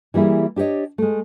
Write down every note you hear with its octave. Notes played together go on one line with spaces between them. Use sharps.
E3 G3 A#3 E4 G#4
D4 G4 G#4 C#5 D#5
G#3 A3